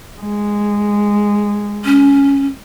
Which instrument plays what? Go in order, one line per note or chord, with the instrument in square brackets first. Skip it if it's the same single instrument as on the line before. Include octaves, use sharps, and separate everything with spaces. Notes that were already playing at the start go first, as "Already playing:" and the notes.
[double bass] G#3
[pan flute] C#4